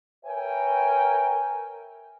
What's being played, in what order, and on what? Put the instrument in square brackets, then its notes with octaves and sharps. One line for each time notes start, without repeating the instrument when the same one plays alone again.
[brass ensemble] A#4 B4 C#5 E5 G5 G#5